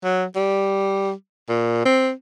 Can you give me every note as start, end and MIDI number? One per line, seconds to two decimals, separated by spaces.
0.04 0.24 54
0.36 1.12 55
1.49 1.81 46
1.85 2.11 60